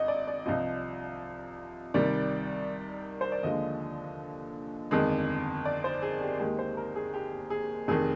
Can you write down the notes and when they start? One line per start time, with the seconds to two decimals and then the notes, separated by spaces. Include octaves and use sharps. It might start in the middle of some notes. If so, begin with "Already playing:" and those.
Already playing: G#1 D#5
0.08 D5
0.27 D5
0.46 C2 C3 F3 D#5
1.94 C2 C3 D#3 G3 D5
3.21 C5
3.32 D5
3.43 D#2 D3 F3 G#3 D#5
4.91 G1 F2 D#3 G#3
5.66 D5
5.84 C5
6.02 G#4
6.21 G4
6.40 D#2 D#3 G#3 G4
6.59 C5
6.77 A#4
6.96 G#4
7.14 G4
7.50 G#4
7.88 F1 F2 D#3 G#4